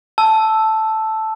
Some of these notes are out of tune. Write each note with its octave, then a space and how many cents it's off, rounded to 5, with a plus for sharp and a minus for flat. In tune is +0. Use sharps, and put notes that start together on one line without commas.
A5 +0 E6 +0